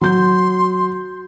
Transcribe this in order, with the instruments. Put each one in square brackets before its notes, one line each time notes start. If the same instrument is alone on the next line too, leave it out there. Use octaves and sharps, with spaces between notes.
[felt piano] F#3 G6 [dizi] C6